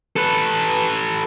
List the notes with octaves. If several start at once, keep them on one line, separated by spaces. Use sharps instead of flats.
A4 B4